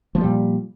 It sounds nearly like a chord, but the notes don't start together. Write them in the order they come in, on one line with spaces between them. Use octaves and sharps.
F3 A3 G3 A#2